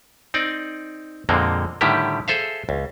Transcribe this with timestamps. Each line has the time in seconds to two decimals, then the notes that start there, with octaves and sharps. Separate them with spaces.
0.34 C4 D#4 D5
1.29 F2 A#2 D3 G#3 A#3 C4
1.81 A2 D3 D#3 G3 E4 G4
2.28 G#4 A4 C5 E5 F5
2.69 C#2